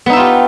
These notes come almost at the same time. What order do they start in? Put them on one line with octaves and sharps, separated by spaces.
B3 D#4 E5 F4 G4